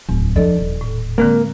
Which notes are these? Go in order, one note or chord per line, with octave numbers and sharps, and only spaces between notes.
D1 E2
F3 D4 A4 D5 D#5
D#1
A2
D3 G#3 A#3 C4